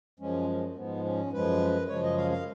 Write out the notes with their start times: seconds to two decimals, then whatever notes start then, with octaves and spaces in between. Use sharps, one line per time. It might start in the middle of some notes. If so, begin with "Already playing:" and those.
0.20 F#2 F3 G#3 C#4
0.76 G#2 F3 G#3 B3
1.04 C#4
1.32 F#2 F3 G#3 B4
1.88 F#2 C#3 F3 G#3 C#5
2.03 D#5
2.17 F5
2.31 F5